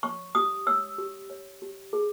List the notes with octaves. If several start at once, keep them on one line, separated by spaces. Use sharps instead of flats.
C#5 C#6
G4 D#6
C#5 E6
G4
C#5
G4
G#4